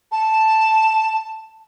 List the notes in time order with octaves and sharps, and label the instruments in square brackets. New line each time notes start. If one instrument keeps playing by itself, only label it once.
[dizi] A5